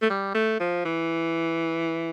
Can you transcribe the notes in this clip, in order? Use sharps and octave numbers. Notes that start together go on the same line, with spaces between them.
A3
G3
A3
F3
E3